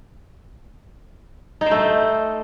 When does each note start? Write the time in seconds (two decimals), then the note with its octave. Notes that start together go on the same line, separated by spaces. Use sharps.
1.61 D#4
1.66 C5
1.71 A3